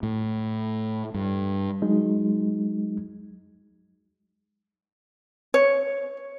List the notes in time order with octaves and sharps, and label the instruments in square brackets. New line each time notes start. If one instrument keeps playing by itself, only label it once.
[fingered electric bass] A2
G2
[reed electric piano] F#3 G#3 D#4
[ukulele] C#5